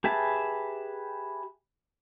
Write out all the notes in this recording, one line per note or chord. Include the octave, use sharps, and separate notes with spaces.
G4 G#4 B4 E5 A5